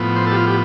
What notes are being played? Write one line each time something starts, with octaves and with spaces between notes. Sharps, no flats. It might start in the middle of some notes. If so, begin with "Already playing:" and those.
Already playing: A2 F3 B3
C5
A4
G4
F4
G4